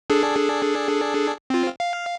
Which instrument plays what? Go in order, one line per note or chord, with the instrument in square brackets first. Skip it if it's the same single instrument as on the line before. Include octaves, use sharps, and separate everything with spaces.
[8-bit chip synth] D4 G#4 A4
C4 F4
F5